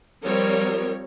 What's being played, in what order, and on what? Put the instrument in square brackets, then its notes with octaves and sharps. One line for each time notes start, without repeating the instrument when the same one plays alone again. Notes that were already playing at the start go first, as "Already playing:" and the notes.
[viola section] F3 G3 C4 A#4 C#5